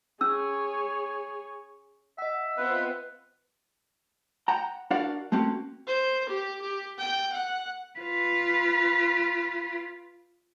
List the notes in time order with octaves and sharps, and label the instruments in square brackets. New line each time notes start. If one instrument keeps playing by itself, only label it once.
[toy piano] C#4 E6 [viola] G#4 C#5
[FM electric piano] D#5 F#5 [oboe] E5
[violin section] B3 C4 F4 [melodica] B4
[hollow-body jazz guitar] F#5 G5 A#5
D4 F#4 A#4 D5 F5 F#5
A3 A#3 C4 C#4 F#4
[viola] C5
G4
G4
G5
F#5
[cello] F4 B4